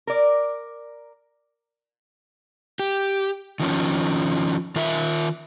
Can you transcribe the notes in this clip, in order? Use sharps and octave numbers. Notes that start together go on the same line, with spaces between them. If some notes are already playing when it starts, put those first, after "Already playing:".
A#4 D5
G4
D#3 F3 C#4
D#3 F4 A#4 E5